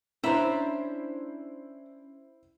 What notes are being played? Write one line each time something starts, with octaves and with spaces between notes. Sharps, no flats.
C#4 D4 E4 C5 E5 A#5 B5